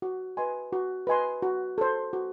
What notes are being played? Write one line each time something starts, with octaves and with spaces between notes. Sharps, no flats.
F#4
B4 D#5 G#5 C6
F#4
B4 D#5 G#5 C6
F#4
A4 C5
F#4